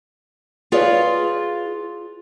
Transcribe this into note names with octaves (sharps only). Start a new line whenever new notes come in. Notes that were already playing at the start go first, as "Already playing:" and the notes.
F4 G#4 B4 C#5 D5 F5